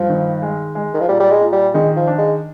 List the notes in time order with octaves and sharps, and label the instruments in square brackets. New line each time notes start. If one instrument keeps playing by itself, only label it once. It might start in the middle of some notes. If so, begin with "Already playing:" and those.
Already playing: [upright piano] G2 [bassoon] F3
[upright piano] D#3
G#3
G#3
[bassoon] D#3
F3
[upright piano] A#2 [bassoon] G3
[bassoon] G3
G#3
[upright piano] A#2
[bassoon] G3
[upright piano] D#3 [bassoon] G#3
[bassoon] F3
[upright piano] D4
[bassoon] G#3